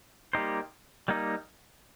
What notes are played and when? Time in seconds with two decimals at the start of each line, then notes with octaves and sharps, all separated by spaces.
0.33 G3 A#3 D#4 G4 C5
1.08 G3 A#3 D#4